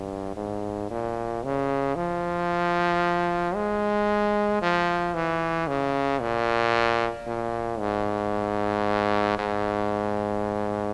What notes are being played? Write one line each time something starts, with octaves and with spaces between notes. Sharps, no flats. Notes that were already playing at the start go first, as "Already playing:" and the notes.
Already playing: G2
G#2
A#2
C#3
F3
G#3
F3
E3
C#3
A#2
A#2
G#2
G#2